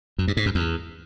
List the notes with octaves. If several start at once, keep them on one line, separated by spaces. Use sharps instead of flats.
F#2
G2
G#2
F#2
E2